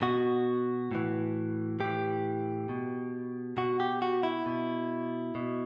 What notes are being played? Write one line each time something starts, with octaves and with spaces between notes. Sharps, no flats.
B2 F#4
A2 E3
A2 E3 G4
B2
B2 F#4
G4
F#4
E4
B2
B2